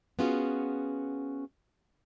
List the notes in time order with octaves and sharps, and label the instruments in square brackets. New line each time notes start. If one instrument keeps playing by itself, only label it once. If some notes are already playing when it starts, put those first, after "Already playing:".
[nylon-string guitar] B3 C#4 F4 F#4 G#4